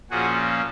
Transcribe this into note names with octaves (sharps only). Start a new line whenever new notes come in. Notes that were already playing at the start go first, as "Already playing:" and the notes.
A#2 F3 A#3 C#4 F#4 G#4